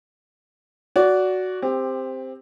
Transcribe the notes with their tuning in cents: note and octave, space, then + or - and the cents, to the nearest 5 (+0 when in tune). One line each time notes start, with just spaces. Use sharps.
F#4 +0 D5 -20
C4 +0 G4 +20